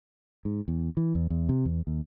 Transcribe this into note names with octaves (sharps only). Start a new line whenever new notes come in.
G#2
E2
E3
E2
E2
C3
E2
D#2